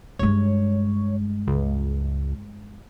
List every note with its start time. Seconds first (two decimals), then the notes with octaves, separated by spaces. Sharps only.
0.19 G2 G#3 C#5
1.47 C#2